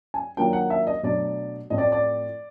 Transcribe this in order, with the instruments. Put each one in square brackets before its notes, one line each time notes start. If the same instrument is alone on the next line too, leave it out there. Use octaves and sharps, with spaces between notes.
[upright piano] G#5
D#3 F#3 A#3 D4 F4 G5
F#5
E5
D#5
B2 F#3 A3 D4 D5
A2 F3 A3 C4 D#5
D5
D5